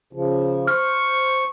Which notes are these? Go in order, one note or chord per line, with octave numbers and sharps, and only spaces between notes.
C#3 F3
C5 C#6 F6